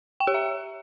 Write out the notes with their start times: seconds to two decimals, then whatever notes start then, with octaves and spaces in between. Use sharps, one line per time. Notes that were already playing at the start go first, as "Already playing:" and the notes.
0.20 G5
0.27 G4
0.34 E5